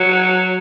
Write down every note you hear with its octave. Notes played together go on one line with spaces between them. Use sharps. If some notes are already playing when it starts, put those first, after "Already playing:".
Already playing: F#3